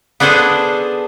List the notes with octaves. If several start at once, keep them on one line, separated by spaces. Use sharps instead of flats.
B3 D4 G#4 A4 C5